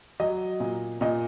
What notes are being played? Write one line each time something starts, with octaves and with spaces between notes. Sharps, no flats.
F#3 D#5
A#2
A#2 D#5